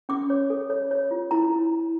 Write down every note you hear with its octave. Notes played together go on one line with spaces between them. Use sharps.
C#4 D6
C#5
A4
C#5
C#5
F4
E4 A#5
E4
E4